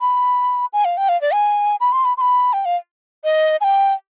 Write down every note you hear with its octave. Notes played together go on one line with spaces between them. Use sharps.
B5
G#5
F5
G5
F5
D5
G#5
B5
C6
B5
C6
B5
G5
F5
D#5
G#5
G5